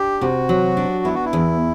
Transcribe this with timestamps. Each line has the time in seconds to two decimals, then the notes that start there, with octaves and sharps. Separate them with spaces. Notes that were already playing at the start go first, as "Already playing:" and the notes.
Already playing: D4 G4
0.21 C3 F#4
0.49 F#3
0.77 D4
1.05 B3 E4
1.15 F#4
1.25 E4
1.33 E2